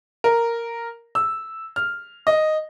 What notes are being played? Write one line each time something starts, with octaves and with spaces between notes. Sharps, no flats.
A#4
E6
F6
D#5